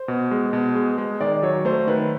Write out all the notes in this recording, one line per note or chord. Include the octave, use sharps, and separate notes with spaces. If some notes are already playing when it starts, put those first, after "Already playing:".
Already playing: C5
B2
G#3
B2
G#3
G#3
D#3 D5
F#3 C#5
A3 C5
D#3 B4